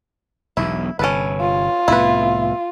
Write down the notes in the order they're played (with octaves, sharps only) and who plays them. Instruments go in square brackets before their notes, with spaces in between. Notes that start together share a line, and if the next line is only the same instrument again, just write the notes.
[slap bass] E1 B1 E2 [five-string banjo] E4
[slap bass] G1 C3 [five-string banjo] C#4 A4 B4
[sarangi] F4
[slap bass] C2 A2 B3 [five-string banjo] E4 B4